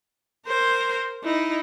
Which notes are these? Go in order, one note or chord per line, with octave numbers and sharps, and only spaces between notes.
A#4 C5
D#4 E4